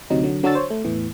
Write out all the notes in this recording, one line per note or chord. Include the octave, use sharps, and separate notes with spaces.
D2 C3 F#3 D#4
D3 F#3
D3 F#3 D4 F#4 E6 A6
C5 C#5
A3
E2 A2 E3